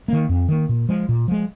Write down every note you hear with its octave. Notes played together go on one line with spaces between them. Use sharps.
D#3 A#3
F2
D#3 A#3
A#2
F3 G#3
A#2
F3 G#3